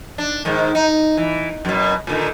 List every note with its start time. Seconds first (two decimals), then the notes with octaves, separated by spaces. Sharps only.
0.18 D4
0.45 G#2 D#3
0.75 D#4
1.17 E3
1.65 F#2 B2
2.07 A#2 D3 D#3